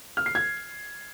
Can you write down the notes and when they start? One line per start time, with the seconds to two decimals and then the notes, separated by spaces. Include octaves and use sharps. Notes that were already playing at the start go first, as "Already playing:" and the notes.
0.17 F6
0.26 C7
0.35 G#6